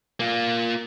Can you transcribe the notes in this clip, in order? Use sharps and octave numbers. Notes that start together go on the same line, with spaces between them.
A#3 F4